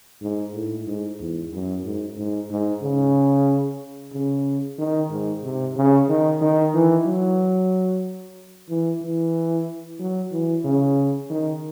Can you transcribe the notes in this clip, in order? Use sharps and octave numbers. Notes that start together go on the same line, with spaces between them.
G#2
A2
G#2
E2
F#2
G#2
G#2
G#2
C#3
C#3
D#3
G#2
C3
C#3
D#3
D#3
E3
F#3
E3
E3
F#3
E3
C#3
D#3